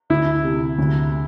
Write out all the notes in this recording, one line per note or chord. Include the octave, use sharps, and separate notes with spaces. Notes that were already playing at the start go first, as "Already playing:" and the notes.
D2 E4
C3
D2